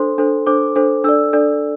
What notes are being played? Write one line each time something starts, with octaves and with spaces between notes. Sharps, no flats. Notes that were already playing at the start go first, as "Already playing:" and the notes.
Already playing: D4 A4 C5 C6
D4 A4 C5
D4 A4 C5 D6
D4 A4 C5
D4 A4 D5 E6
D4 A4 D5